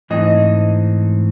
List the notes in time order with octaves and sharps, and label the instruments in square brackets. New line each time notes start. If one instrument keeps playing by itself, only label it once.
[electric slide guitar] G#2 E3 A3 C4 D#4 [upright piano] D#5